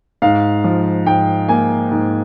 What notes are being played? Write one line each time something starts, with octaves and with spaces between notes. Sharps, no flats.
G#2 F5
F3
G#2 G5
A#3 G#5
G#2